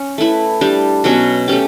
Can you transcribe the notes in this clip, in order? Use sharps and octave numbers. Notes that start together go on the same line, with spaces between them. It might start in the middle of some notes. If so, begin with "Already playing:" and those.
Already playing: C#4
A3 E4 B4
G3 D4 G4
B2 F#3 C#4 F#4
A3 C#4 G4